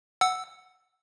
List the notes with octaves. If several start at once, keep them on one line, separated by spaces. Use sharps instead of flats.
F#5 E6